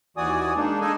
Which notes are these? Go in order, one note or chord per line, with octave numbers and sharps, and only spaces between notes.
D#2 E3 F#4 D5 G#5 D#6
G#3 A#3 D4 D#4
G#3 D4 D#4 A4 D#5 G#5